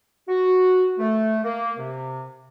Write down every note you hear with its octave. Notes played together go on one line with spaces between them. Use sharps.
F#4
A3
A#3
C3